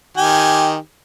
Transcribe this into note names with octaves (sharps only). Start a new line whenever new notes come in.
D#3 G4 G#5